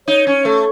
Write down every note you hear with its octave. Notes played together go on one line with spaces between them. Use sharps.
D#4 C#5
C#4
A3 A4